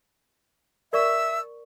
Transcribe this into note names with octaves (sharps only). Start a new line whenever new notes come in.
A#4 D5 E5 C#6 E6